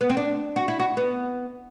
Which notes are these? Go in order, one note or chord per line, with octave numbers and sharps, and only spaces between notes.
B3
C4
D4
F#4
E4
F#4
B3